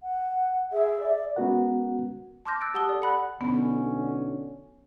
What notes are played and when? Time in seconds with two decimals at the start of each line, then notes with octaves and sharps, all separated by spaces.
0.03 F#5
0.72 G#4 E5
1.00 D5
1.36 G#3 B3 C#4 F#4 A#4 F#5
2.45 A5 C6 D6 F6 G6 A#6
2.61 E6 F#6 A6 D7
2.74 G4 F#5 A5 D#6 G7
2.89 A4 D5
3.02 F#5 B5 F#6
3.41 B1 D3 B3 C#4